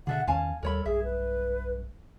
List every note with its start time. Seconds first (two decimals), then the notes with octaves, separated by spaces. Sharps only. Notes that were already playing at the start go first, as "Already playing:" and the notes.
0.07 B2 D3 G#4 A4 E5 F#5
0.27 E2 D#3 C#4 F5 G#5 A5
0.63 D#2 G3 A4 A#4 C#5 B5
0.86 B1 G2 G#4 E5
1.04 B4